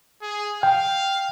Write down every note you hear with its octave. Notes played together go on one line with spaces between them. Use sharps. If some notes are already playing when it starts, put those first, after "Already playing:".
G#4
F5 G5